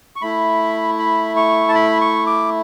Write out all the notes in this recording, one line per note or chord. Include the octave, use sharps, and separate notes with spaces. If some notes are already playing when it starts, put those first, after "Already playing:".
C#6
A3 E4 B5
B5
C#6
A5
B5
C#6
D6